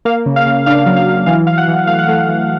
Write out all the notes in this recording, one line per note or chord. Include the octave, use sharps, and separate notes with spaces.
A#3 F5
C#3
F5
C#3
D4 F5
F#3
F5
F#3
E3 F5
E3 F5
F#5
E3
A3 F5
F#5
A3 F5
E3